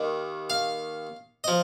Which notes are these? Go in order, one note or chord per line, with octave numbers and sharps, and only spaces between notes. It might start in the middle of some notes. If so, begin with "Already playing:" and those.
Already playing: D#2 D#3
F5
F3 D#5